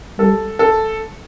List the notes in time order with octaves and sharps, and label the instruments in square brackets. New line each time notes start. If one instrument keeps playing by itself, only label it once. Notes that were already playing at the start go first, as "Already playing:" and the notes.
[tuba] G3 [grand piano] A4
[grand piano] A4